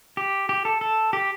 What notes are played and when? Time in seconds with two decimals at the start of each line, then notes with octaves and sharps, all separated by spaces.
0.17 G4
0.49 G4
0.65 A4
0.81 A4
1.13 G4